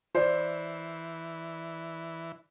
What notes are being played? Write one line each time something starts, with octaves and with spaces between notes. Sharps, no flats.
E3 C5 D5